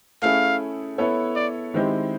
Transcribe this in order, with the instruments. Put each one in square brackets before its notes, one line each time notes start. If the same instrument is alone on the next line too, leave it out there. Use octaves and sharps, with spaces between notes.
[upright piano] A3 C#4 E4 G#4 [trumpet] F5
[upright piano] B3 E4 A4 C#5
[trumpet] D5
[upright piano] D#3 G#3 C4 E4 G4